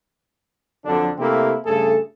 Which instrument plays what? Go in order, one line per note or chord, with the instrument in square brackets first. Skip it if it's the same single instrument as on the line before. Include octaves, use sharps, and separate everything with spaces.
[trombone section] F2 D3 F#3 D4
C3 A3 A#3 C4 E4 G4
G2 C#3 A3 G#4 A4